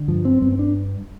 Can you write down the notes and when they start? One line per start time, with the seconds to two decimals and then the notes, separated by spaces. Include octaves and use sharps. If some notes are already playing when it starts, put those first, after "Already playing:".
Already playing: D3
0.08 G2 F3
0.25 C4
0.42 G2 C4
0.52 C4
0.59 D4